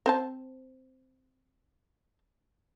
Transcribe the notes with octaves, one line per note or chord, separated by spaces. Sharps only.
C4 C5 A5